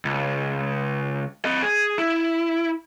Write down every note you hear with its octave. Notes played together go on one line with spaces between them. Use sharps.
C#2
C4 D#5
G#4
E4